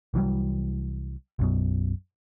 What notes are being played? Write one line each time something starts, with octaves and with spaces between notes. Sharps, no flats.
C2 E3 F#3 G3
B1 F#2 B2